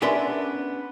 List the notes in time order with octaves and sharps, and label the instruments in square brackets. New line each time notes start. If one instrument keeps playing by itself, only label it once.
[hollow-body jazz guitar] B3 C#4 D4 A#4 E5 C6